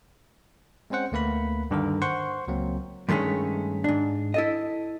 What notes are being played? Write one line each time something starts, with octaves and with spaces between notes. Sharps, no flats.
G#3 C4 C#4 C5 F#5
D2 A3 A#3 B4 B5
G2 D3 D#3 A#4
C5 F#5 C6 C#6
C#2 F#3 A#3 C4
G2 D#3 G#3 A3 C#4
G#2 D4
E4 A4 D#5